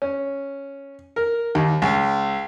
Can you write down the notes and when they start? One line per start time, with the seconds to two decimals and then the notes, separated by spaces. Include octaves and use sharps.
0.02 C#4
1.16 A#4
1.55 D#2
1.82 C#2